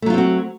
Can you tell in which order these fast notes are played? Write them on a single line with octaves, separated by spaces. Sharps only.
A3 F#3 F4 C4 F#4